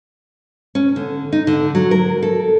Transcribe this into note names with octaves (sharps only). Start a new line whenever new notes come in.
C#4
D3
D#4
D3
F#3
A#4
A4